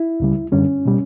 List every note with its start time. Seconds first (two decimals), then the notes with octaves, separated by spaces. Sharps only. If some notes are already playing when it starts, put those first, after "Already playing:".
Already playing: E4
0.20 C#2 C#3 G3
0.52 F#2 D3 G3 C#4
0.86 B2 G3